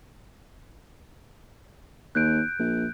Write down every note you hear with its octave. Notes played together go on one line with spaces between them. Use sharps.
D#2 F#6 G6 D7
A#1